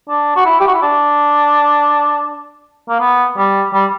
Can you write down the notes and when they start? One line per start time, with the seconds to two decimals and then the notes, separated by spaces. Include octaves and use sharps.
0.09 D4
0.36 F#4
0.45 E4
0.60 G4
0.67 F#4
0.74 E4
0.82 D4
2.89 A#3
3.00 B3
3.37 G3
3.73 G3